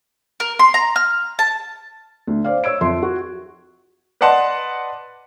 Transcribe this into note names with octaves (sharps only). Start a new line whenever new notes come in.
A#4
C6
A#5
F6
A5
D2
C5 D5 F5
C#5 E6 G#6 D7
F2 E5 C6
F#4
B4 D5 D#5 F#5 A5 C6